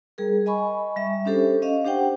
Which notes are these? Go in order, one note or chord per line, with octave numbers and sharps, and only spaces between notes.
G3 G#4 A#4
D#5 G#5 B5 C#6
G3 E5
C#4 D4 G4 A4 C5
C#4 D#5 F5
D4 G4 C5 F#5 G5